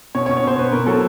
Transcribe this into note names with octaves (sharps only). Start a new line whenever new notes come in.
B2 C#5
C#5
B2
C#5
B2 C5
B2 B4
B2 A#4
F#3 A4